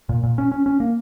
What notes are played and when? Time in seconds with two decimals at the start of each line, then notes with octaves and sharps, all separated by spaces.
0.09 A#2
0.23 A#2
0.38 C#4
0.52 C#4
0.66 C#4
0.80 A#3